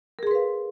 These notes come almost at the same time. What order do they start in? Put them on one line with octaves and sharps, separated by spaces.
A#4 G#4 C6 B4 F5